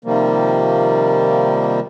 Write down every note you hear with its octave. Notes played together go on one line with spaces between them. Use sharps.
C3 D#3 F3 G3 A#3